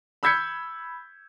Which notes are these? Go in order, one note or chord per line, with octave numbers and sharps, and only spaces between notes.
B5 E6 G6 G#6 B6 C#7